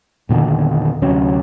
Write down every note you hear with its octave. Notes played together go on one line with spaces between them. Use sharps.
E2 A#2 D3 D#3
D2 C3 F#3 C#4